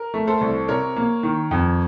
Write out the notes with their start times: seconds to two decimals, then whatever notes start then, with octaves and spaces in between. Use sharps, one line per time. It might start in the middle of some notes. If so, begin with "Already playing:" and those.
Already playing: A#4
0.14 A3
0.27 A4 C5
0.41 C2
0.68 C3 A#4 C#5
0.96 A#3
1.23 D#3
1.51 F2